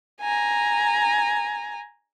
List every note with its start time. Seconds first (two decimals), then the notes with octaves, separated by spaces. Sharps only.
0.21 G#5 A#5